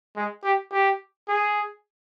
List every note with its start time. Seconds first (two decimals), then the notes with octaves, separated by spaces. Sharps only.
0.16 G#3
0.44 G4
0.72 G4
1.28 G#4